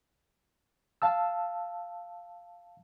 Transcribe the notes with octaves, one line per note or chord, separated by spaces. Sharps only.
F5 A5 E6